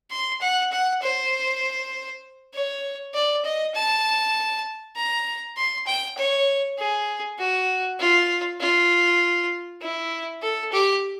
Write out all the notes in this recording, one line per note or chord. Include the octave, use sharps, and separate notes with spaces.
C6
F#5
F#5
C5
C#5
D5
D#5
A5
A#5
C6
G5
C#5
G#4
F#4
F4
F4
E4
A4
G4